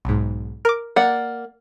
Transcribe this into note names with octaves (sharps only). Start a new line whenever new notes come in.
B1 G#2
A#4 D6
A#3 D5 F#5